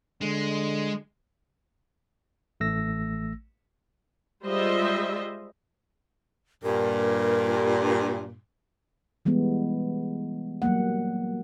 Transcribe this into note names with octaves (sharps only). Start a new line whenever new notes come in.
D3 G#3
A1 A3 E6 A#6
G3 G#3 F4 C5 D#5 E5
G2 A#2 A#4
E3 G3 G#3 B3
F#3 G3 A#3 F#5